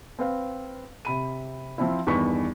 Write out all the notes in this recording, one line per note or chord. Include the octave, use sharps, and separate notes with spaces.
C4 B4 F5
C3 B5 D#7
F3 C4 E4
E2 G2 D#3 B4 C#6 B6